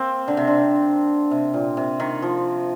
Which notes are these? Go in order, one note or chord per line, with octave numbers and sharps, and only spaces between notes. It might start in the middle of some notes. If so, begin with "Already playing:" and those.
Already playing: A#3 C4
D3
C3
D3
C3
A#2
C3
D#3
F3